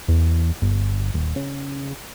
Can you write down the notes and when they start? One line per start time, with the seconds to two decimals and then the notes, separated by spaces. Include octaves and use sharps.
0.08 E2
0.62 G1
1.14 D#1
1.36 C#3